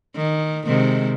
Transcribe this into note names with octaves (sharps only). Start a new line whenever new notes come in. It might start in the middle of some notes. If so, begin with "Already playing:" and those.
D#3
C3 D#3 G#3